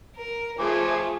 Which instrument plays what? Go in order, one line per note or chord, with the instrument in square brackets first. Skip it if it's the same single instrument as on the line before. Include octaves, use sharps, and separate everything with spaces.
[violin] A#4
[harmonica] F3 G#5 D6 [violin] A3 F4 [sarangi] G#4